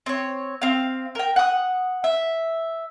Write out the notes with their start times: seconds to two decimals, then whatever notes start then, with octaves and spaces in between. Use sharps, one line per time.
0.06 C4 C#5
0.62 C4 F5
1.15 A#4 G5
1.36 F#5 D#6
2.04 E5